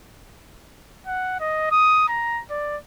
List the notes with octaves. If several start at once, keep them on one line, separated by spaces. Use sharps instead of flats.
F#5
D#5
D#6
A#5
D5